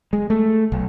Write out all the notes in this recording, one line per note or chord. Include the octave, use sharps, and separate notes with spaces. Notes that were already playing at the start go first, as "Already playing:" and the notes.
G#3
A3
B1